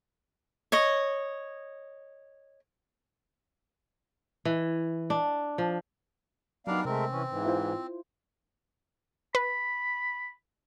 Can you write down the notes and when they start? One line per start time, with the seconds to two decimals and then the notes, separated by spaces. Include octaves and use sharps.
0.72 C#5 D#5
4.45 E3
5.10 D4
5.58 F3
6.67 F#3 G3 B3 D4 D#4 A#4 D5 F5
6.85 C3 G#3 A3 C4 A#4
7.10 E3 C#4
7.29 G#2 E3
7.45 E4 F4 C5
9.35 B4 B5